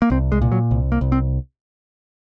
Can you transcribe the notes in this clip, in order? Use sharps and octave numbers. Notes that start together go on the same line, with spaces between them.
A#3
C2 C4
G#3
A#2
F#3
C2
A#3
C2
C4